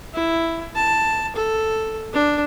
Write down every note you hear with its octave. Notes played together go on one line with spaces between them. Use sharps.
E4
A5
A4
D4